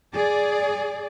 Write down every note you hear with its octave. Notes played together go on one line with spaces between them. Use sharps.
G#4 D5